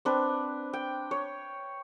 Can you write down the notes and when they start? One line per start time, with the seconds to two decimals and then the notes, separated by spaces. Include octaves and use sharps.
0.05 C4 D4 B4
0.73 G5
1.11 C#5